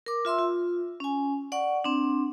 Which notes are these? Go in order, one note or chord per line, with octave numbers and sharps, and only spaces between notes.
A#4 D6
F4 E5 C6 E6
F4
C#4 G#5
D5 F#5 C#6
C4 D4